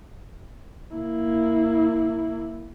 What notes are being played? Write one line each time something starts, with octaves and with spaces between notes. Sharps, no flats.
A#3 E4